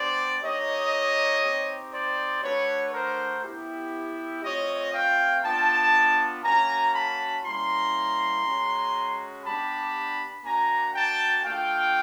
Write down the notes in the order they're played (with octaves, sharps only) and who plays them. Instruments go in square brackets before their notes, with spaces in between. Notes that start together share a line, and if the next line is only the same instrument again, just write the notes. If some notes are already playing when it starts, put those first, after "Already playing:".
Already playing: [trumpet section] B3 D4 G4 C5 D5
A#3 D#4 G4 C#5 D#5
C4 D#4 G4
C5 D5
A3 D4 F#4 B4 C#5
A#4 C5
B3 E4 G4
A3 C4 F4 C#5 D#5
F5 G5
B3 D4 F4 G5 A5
A#3 C#4 F#4 G#5 A#5
A5 B5
G3 A#3 C#4 E4 A#5 C6
G#3 C#4 F#4
B3 D4 G4 A5 B5
A#3 D4 F#4 G#5 A#5
G5 A5
A3 D4 F4 F5 G5